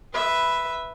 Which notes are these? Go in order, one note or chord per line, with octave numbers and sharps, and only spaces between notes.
B4 E5